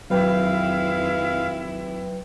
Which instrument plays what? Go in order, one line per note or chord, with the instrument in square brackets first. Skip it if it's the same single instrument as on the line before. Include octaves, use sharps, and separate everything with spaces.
[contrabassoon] G#1 [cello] F2 E4 [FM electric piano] F#3 B4 G5 [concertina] F5